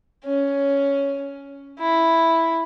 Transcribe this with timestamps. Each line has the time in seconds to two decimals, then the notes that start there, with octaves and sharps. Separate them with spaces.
0.24 C#4
1.79 E4